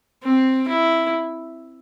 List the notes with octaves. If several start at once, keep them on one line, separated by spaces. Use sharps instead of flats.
C4
E4